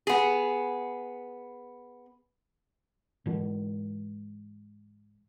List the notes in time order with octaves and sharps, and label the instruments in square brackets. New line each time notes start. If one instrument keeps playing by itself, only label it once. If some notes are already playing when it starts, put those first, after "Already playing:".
[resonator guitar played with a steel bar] B3 G#4
[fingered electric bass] G#2 E3 G#3